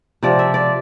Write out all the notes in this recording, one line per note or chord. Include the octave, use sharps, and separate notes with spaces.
C3 F3 D5
E5
D5